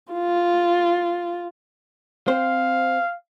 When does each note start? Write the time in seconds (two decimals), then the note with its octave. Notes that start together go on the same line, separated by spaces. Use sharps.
0.13 F4
2.28 C4 C5 F5